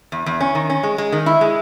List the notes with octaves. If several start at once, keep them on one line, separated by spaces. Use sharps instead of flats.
E2
E2
C#4
D#3
C#4
G#3
G#3
D#3
E4
G#3